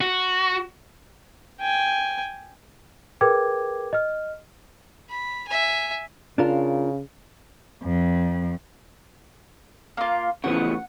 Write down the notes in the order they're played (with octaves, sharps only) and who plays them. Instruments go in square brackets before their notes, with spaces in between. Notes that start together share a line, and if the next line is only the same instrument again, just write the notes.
[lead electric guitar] F#4
[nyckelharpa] G5 G#5
[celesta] G#4 A#4 B4 G5 D6 G#6
D#5 F6
[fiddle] B5
E5 G#5
[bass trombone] C#3 [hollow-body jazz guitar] D4 F4 A#4
[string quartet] F2
[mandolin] A#3 F4
[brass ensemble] A1 [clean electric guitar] C#3 F3 B3 [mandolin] F#5